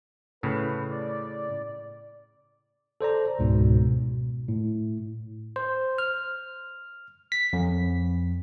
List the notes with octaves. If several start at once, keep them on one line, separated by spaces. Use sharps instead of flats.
A2 C#3 B4
D5
A4 C5 D5 A#5
C#2 G#2 B2
B2
A2
C5
F6
B6
F2